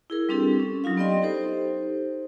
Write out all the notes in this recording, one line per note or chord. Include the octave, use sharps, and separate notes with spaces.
E4 G#4 A#4
G3 C4 D4 G4 A4
C#4
F#3 D#4 F4 F5
B3 G4 D5 D#5 G5 C6
D#4 G4 A4 C5